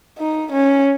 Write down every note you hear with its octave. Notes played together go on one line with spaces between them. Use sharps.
D#4
C#4